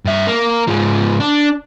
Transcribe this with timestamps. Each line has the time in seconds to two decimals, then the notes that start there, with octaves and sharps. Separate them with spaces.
0.05 G2 E5
0.27 A#3
0.68 G#2 F3
1.20 D4